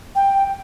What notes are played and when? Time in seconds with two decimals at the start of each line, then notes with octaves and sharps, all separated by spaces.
0.15 G5